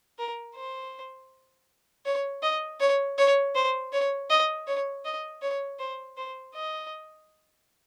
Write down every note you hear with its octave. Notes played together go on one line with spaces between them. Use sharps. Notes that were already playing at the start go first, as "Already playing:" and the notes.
A#4
C5
C#5
D#5
C#5
C#5
C5
C#5
D#5
C#5
D#5
C#5
C5
C5
D#5